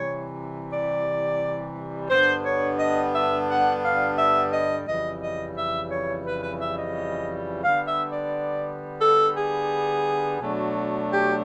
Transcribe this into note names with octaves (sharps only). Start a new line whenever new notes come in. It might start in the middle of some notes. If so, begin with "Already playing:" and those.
Already playing: C3 E3 G3 C#5
D5
G2 D3 G3 B3 D4 C5
C#5
D#5
E5
F#5
F5
E5
D#5
F2 C#3 E3 G3 D#5
D#5
E5
C#5
B4
B4
E5
D#5
D3 G3 B3 F5
E5
D5
A4
G#4
B2 F#3 A3 D4
G4